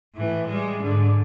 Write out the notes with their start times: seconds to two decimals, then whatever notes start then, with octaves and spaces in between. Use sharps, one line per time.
0.15 A2 E3
0.47 G3 G#3
0.80 G#2 D3